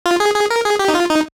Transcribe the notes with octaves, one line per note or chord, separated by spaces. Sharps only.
F4
G#4
G#4
A#4
G#4
G4
D#4
F4
D#4